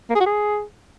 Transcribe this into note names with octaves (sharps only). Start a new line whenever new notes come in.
A#3
G#4
F#4
G#4